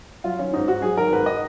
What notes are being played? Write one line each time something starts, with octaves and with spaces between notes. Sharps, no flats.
F#3 F4
D#3 C#4
G#2 D#4
G#2 F#4
F#3 G#4
D#3 A#4
G#2 B4
D#5